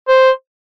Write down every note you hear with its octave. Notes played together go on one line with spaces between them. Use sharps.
C5